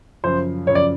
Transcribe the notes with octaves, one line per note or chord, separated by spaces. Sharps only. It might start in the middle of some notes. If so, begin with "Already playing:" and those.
F#2 C#3 F3 C5
F#2 C#3 F3 C#5
D5